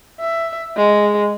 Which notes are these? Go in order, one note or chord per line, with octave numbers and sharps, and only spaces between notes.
E5
G#3